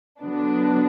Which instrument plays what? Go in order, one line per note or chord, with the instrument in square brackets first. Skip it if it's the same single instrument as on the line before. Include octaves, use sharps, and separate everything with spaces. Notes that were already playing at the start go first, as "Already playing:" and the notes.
[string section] D3 F#3 B3 D4